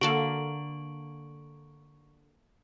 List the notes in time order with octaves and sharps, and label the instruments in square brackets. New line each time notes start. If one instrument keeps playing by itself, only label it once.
[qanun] D3 A#3 [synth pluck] F#4 A4 F5 [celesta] C#6 D7 F#7